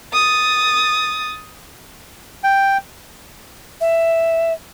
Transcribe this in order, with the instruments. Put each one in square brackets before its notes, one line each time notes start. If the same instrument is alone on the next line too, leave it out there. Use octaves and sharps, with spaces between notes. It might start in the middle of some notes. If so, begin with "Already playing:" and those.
[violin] D#6 A6
[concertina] G5
[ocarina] E5